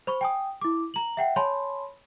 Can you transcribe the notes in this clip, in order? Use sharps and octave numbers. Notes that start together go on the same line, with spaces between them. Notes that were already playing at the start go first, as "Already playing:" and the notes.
C5 B5 C#6
G5 G#5 D#6
E4 D6
A#5 F#7
E5 F#5 G5
C#5 G#5 A5 B5 C6